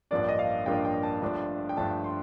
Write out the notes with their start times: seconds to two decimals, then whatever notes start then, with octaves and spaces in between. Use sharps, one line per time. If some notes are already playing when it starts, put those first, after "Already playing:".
0.11 A1 G2 F3 A#3 D4 D5
0.29 D#5
0.39 F5
0.66 A1 G2 F3 A#3 D4 G5
0.85 G5
1.03 A5
1.22 G1 G2 F3 A3 D4
1.69 G5
1.77 G1 G2 F3 A3 D4 A5
2.04 C6